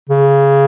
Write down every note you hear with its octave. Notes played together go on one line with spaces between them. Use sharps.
C#3